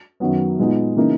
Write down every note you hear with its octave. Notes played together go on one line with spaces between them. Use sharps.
F#2 D#3 F#3 B3
A#2 G#3 B3 D#4
C#3 E3 A#3 D#4